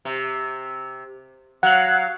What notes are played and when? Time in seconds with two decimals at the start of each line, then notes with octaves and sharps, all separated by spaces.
0.05 C3
1.63 F#3 F5 F#5 F#6